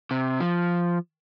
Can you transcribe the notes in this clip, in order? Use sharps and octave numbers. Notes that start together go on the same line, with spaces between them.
C3
F3